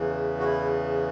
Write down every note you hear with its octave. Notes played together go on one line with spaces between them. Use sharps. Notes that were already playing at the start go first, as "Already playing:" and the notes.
Already playing: E2 C#3 E3
F#4
E4